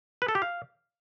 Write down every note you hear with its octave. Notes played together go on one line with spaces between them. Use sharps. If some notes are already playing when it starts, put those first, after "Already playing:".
B4
A4
G4
F5